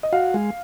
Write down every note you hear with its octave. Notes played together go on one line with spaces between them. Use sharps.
D#5
F#4 F5
G#3